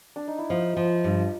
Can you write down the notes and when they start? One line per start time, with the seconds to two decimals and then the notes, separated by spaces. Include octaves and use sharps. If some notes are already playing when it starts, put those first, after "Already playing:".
0.16 D4
0.28 D#4
0.39 E4
0.50 F3 D#4 F4
0.77 F3
1.04 G2